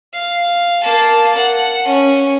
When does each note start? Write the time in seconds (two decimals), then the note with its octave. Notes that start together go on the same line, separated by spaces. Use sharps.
0.13 F5
0.83 A#3 A5
1.35 F#5
1.85 C#4